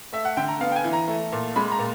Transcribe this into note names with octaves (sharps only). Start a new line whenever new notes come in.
A3 E5
F#5
D3 G5
A#5
B3 F5
G5
G#5
E3
A#5
A3
A#2
G#3 B5
A#5
A#2